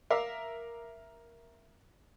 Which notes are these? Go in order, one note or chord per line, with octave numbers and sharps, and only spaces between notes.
A#4 E5 F5 D6